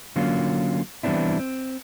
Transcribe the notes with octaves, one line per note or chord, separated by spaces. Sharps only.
D3 F#3 A#3 C#4 F4
E3 G3 B3 C4 D4 E4
C4